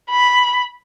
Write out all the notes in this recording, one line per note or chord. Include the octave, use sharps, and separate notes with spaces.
B5